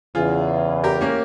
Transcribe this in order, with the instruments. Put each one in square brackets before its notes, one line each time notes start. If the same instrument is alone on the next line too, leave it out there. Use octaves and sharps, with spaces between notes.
[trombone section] E2 C#3 E3 [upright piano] F4 G#4
[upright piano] G4 A#4
A#3 C#4